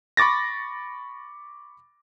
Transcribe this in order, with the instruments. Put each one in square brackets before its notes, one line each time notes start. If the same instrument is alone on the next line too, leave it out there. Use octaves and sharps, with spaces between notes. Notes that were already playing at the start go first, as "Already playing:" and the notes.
[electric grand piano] B5 C#6 D6 A6 A#6